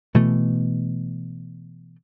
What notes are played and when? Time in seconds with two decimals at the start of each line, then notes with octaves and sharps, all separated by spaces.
0.14 B2 E3 A3